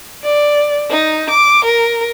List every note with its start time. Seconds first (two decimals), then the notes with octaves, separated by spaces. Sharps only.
0.23 D5
0.90 D#4
1.30 D6
1.65 A#4